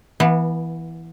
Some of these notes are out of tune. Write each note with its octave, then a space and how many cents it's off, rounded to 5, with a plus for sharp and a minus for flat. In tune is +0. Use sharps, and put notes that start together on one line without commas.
E3 +0 B3 -25